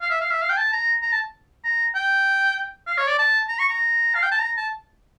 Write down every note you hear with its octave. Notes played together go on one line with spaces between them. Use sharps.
F5
E5
F5
E5
F5
G5
A5
A#5
A#5
A5
A#5
G5
F5
C#5
D5
A5
A#5
C#6
A#5
F5
G5
A5
A#5
A5